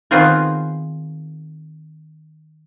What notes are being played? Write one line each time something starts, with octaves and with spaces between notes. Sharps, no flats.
D#3 B3 C4 F4 G#4 A#4